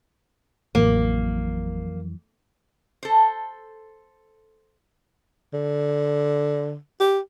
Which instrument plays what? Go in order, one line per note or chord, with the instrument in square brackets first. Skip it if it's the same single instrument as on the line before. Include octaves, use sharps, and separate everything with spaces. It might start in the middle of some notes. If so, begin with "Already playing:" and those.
[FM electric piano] A1 [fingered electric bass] F2 E3 F#3 [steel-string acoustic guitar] A#3
[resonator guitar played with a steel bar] A4 C5
[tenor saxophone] D3
G4